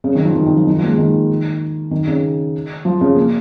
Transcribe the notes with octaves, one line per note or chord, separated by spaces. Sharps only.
C#3
D#3
F3
D#3
D#3
F3
D#3
F3
A#3
G#3
D#3
D#3
C#3
F3
C#3
A#3